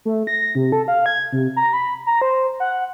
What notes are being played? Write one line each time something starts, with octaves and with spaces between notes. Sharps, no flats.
A3
A#6
C3
A4
F5
G#6
C3
A#5
B5
A#5
C5
F#5